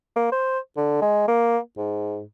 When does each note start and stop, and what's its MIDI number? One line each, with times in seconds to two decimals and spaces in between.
0.16 0.28 58
0.32 0.59 72
0.77 0.99 50
1.02 1.26 56
1.28 1.58 58
1.77 2.22 44